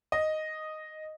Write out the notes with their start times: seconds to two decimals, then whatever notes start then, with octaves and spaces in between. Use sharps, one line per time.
0.12 D#5